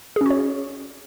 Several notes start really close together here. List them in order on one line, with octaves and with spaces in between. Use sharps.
G#4 C#4 F#4 C#5